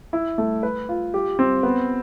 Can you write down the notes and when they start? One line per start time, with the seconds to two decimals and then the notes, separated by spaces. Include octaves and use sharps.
0.13 E4
0.38 A3
0.63 B4
0.89 F4
1.14 G4
1.39 C4
1.63 B3